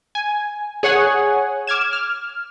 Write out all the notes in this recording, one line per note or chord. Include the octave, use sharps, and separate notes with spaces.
G#5
G#4 C#5 F#5 G#5
D6 F6 G#6 E7
F6